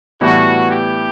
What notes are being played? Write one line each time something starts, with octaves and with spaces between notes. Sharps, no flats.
A2 E3 G3 B3 E4 F#4
G4